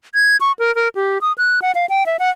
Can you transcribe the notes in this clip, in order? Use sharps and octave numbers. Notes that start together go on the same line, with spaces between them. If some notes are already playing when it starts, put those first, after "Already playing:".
G#6
C#6
A#4
A#4
G4
D#6
F#6
F#5
F5
G5
E5
F#5